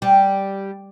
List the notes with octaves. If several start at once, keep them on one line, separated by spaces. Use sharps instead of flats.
G3